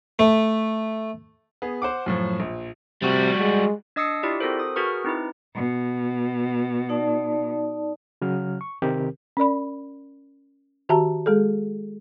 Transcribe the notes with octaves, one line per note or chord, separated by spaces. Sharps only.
A3
B3 G#4
C5 F#5 D6
F#2 A2 F3
A#1
C3 G3 F#4
G#3
D4 D#5 D#6 E6 C7 C#7
E4 F4 G4 D5
C4 F#4 A4 A#4 C5
D#6
F#4 G#4 A#4 B4 C#6 F6
C4 D#4 E4 B4
B2
D#4 D5 A5
C#3 F#3 F6
C#6
C3 D#3 C4 G4 A#4
C#4 A#4 D5 B5
D#3 F#4 G4 E5 A5 A#5
G#3 G#4 A4